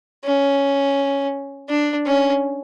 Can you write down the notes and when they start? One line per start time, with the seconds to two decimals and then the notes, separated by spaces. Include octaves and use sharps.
0.24 C#4
1.69 D4
2.06 C#4